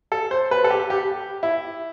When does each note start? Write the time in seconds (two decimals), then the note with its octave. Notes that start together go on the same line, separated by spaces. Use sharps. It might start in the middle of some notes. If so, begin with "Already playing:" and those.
0.12 A4
0.31 C5
0.51 B4
0.64 A4
0.70 G4
0.90 G4
1.43 E4